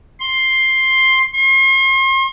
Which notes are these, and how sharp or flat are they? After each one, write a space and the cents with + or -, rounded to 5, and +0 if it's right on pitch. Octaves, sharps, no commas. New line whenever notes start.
C6 +10
C6 +40